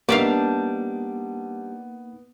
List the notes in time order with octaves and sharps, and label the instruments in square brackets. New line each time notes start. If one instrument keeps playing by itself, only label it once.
[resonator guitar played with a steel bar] G3 D4 [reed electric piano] A#3 D#4 [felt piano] B3 [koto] D5 E5 F5